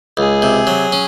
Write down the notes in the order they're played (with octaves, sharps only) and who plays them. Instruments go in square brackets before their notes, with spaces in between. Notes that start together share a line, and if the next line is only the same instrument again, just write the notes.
[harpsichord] C#2 [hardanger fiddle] G#4
[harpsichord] C3
F#3
C#4